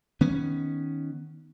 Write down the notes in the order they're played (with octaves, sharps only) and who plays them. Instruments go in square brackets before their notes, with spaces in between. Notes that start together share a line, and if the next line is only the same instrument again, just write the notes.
[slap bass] D#3 B3 C#4